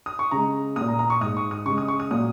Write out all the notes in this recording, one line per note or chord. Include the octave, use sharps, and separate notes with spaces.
D#6
C#6
C#3 G#3 A#5
A#3 D#6
A#2
A#5
A#5
C#6
G#2 G#3 D#6
C#6
D#6
C#3 G#3 C#6
D#6
C#6
D#6
A#2 F#3 A#3 D#6